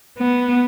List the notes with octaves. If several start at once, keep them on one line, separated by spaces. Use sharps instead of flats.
B3